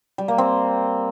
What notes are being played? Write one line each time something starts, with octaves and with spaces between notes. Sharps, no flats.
G3
A#3
C4